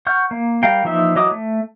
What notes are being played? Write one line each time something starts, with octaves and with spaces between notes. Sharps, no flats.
F#5 C#6 F6 G6
A#3
G3 A#4 F5 G5
E3 F3 A#3 D#4 E5
E3 F#3 D#5 D6 D#6
A3